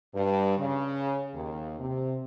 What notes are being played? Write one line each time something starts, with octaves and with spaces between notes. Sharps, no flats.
G2
C#3
D#2
C3